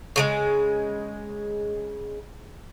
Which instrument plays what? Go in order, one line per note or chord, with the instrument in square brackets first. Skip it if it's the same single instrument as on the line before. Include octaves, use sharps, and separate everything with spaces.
[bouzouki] C#3 F3 G#3